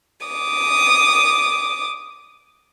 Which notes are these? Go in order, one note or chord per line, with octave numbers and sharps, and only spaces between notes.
D6 D#6